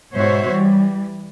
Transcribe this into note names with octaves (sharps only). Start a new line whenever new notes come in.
G#2 B2 F#4 C5 C#5 E5
E3 G3